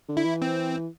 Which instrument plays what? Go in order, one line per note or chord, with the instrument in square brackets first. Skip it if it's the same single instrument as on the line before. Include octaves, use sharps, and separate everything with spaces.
[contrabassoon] D3
[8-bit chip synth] E4
[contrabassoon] E3
[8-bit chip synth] C4